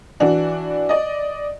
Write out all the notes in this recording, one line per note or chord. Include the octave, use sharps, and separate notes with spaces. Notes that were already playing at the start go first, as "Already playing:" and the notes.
E3 D4 F#4
D5 D#5